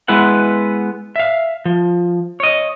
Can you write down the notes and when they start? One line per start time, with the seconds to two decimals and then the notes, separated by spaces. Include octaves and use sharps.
0.08 G#3 B3 E4 B4 F#5
1.16 E5 F5
1.65 F3
2.40 C#5 D#5